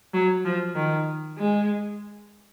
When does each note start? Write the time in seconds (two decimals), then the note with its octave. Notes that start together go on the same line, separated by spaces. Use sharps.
0.14 F#3
0.45 F3
0.75 D#3
1.38 G#3